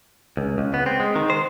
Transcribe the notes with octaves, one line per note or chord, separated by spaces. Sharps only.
C#2
C#2
B3
C4
G#3
D#3
C5